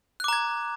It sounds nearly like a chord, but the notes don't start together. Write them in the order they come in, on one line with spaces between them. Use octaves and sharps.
F#6 D6 A#5 G#6